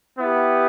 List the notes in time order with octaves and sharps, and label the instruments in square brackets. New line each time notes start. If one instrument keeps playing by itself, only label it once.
[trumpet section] B3 E4 G4